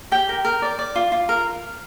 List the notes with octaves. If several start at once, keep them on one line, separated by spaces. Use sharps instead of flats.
G4 G5
A#4
A#4
D5
D5
F4
F4
A#4